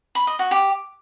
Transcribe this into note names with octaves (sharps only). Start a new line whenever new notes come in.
B5
D#5
F#4
G4